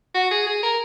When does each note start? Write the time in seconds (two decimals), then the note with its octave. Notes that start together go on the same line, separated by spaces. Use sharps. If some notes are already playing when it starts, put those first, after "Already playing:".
0.15 F#4
0.31 G#4
0.46 G#4
0.63 A#4